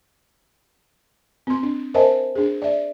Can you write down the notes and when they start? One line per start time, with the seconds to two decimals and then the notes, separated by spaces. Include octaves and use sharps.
1.47 C4 C6
1.63 D4
1.94 A#4 C5 D#5 E5 G#5 A5
2.35 D4 G#4
2.62 D5 E5